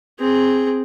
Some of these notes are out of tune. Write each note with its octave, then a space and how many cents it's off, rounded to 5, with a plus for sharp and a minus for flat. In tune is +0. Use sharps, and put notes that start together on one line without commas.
C4 +0 G#4 +0